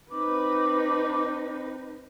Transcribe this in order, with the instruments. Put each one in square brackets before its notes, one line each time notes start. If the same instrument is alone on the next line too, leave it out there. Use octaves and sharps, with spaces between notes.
[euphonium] C4 [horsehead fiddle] D#4 B4 [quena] D6